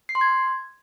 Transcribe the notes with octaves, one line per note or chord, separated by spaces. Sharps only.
C7
C6
G#6